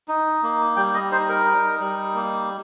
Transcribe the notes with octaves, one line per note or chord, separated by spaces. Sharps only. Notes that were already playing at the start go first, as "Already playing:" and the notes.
D#4
A#3
G3 G5
D#5
D#4 C5
A#4
D#4
G3
A#3